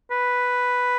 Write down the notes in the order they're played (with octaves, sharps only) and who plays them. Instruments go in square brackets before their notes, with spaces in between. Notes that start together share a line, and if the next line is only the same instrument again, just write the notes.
[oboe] B4